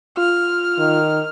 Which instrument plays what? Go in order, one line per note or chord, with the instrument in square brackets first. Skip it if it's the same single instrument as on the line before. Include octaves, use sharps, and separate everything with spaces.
[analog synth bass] F4 [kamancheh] F6
[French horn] D#3